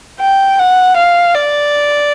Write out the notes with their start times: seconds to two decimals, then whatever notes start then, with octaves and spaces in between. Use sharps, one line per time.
0.20 G5
0.59 F#5
0.96 F5
1.35 D5